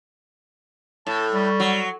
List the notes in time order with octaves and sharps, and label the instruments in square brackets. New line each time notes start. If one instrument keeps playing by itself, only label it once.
[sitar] A2 [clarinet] A5
[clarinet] G3
[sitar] F#3